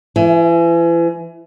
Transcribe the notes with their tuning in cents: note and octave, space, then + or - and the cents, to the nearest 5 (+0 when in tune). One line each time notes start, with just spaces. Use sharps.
E3 +35